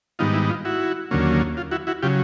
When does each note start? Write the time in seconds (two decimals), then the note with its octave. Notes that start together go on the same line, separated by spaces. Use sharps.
0.19 G#2 D#3 G3 B3 D#4 F4
0.34 E4
0.50 F4
0.65 E4 F#4
1.11 D#2 D3 F#3 A#3 C#4
1.57 F4
1.71 E4 F#4
1.87 E4 F#4
2.02 C#3 F#3 F4 G4